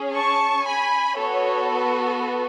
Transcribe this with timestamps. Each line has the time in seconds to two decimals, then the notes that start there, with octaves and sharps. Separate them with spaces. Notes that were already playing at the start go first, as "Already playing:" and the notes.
Already playing: C#4 G#4
0.15 A5 C#6
0.66 G#5 B5
1.18 B3 F#4 A4 C#5
1.71 B4